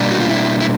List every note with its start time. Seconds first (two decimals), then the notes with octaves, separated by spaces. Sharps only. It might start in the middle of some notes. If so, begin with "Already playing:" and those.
Already playing: B2 G3 A#3 D4
0.11 F#4
0.20 F4
0.29 E4
0.60 E4